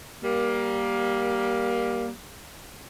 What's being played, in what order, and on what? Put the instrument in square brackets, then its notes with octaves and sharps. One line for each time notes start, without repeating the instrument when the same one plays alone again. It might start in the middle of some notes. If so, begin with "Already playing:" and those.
[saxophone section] G3 A#3